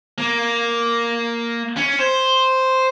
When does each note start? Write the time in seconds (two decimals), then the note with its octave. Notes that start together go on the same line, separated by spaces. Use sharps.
0.18 A#3
1.77 C#4
1.99 C5